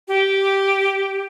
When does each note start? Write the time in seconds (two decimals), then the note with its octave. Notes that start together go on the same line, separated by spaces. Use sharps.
0.08 G4